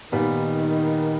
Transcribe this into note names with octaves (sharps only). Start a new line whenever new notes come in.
A#2 D#3 G3 B3 D#4